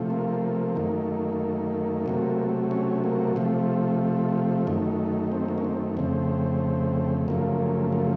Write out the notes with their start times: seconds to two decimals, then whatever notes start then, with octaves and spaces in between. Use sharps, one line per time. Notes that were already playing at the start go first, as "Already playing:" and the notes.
Already playing: C3 F3 A3
0.10 A#3
0.75 F#2 D#3 A3
2.06 C3 F#3 A3
2.71 C#4
3.04 A#3
3.36 C3 F3 A3
4.67 F#2 D#3 A3
5.32 C4
5.48 A#3
5.58 C#4
5.64 C4
5.97 F2 C#3 A3 C4
7.28 F#2 C#3 F3 A3 A#3
7.92 A#3